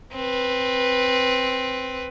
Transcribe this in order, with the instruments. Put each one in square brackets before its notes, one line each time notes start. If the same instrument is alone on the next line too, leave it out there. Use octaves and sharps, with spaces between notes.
[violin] C4 B4